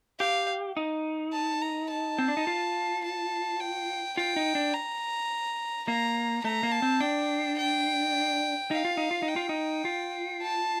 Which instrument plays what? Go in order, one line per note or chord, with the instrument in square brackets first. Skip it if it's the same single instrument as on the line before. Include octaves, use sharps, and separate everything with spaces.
[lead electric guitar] G4 [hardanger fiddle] F5
[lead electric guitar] D#4
[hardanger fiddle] A5
A#5
A5
[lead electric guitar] C4
D4
D#4
F4
[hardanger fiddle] A5
G5
[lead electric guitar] F4 [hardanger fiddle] G5
[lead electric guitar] D#4
D4
[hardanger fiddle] A#5
[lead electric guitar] A#3 [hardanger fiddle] A#5
[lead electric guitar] A3 [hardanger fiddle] A#5
[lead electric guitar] A#3
[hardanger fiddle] A5
[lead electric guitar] C4
[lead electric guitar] D4 [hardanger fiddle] G5
[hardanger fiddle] G5
[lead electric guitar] D#4 [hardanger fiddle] F5
[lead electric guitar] F4
D#4
F4
D#4
[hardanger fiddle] G5
[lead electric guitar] F4
D#4
F4
[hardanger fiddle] A5